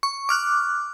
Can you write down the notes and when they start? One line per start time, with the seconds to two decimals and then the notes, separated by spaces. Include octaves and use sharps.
0.03 C#6
0.29 D6 F6 F#6